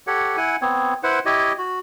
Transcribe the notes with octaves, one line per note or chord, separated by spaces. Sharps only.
G4 A4 C#5 F#5
E4 F#5 G#5
B3 C4 C#5
E4 B4 C5 F#5
E4 G4 C#5 D#5
F#4